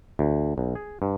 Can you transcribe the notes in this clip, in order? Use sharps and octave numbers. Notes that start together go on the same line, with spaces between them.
D2
B1
G#4
G2